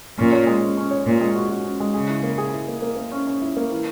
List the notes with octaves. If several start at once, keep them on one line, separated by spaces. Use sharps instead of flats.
A#2 C#4
C#5
G#3
C#4
C#4
C#5
A#2 C#5
G#3
F#4
F#4
C#4
G#3
C#3 G#4
E4
A#3
G#4
E4
A#3
A#3
A#3
C#4
C#4
E4
A#3
E3